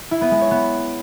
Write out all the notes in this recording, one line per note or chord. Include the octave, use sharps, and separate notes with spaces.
E4
B3
G#3
C#5
B3